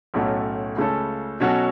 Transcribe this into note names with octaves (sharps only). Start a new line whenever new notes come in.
B1 A2 A3 C#4 F#4
C#2 C#3 A3 C#4 A4
B2 F#3 C#4 F#4 A4